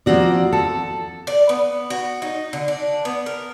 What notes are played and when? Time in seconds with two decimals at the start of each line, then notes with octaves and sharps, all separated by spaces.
0.06 F3 A#3 C4 F#4 D5
0.53 A4
1.27 D5
1.49 B3
1.90 F#4
2.22 D#4
2.53 D3
2.68 D4
3.05 B3
3.26 A#4